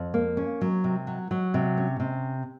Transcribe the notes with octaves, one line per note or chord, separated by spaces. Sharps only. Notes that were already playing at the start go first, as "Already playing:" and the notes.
Already playing: F2
A#3
C#4
F#3
C3
F#3
F#3
C3
C#4
C3